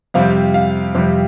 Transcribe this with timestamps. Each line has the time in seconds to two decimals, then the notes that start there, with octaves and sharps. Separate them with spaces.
0.14 F2 C3 G3 F5
0.54 F5
0.95 F2 C3 G3